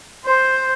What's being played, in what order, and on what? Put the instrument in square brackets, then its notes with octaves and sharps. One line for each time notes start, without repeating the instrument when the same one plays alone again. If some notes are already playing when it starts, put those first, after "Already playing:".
[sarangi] C5